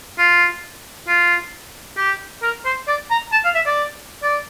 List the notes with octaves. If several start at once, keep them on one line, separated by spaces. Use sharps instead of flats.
F4
F4
G4
A#4
C5
D5
A#5
A5
F5
E5
D5
D5